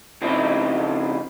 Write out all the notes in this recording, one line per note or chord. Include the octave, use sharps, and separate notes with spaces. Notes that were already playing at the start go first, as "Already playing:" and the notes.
C#3 F3 C4 D#4 E4